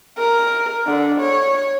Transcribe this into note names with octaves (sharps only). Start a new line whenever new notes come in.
A#4
D3
C#5